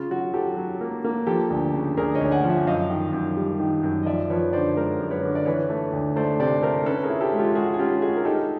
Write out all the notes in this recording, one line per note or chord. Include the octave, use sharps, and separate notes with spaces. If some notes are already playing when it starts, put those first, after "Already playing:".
Already playing: C#3 F4
F#3 F#4
F#3 G4 A4
F#3
A#3
A#3
F3 G4 A4
D2
C#3
D2 G#4 A#4
C#5 D#5
D2
F#5 G#5
F3
E5 F#5
F#2 D#5 F5
D#3
F#2
G3
D#3
F#2
D#5
F3 D5 E5
F3 B4 C#5
D3 C5 D5
G#3 A#4 C5
F#2
B4 C#5
D3
D5
E3 B4 C#5
A3
D2
A3 C5 D5
C3 C5 D5
A3 A#4 C5
C#4 A4 B4
G#4 A#4
E4
G4 A4
G#3
F4 G4
G#3 F#4 G#4
G#4
C#4 F4 G4
G#3 F#4 G#4
A#4
D#4 G4 A4